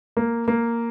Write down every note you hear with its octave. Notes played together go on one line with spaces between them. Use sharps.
A#3
A#3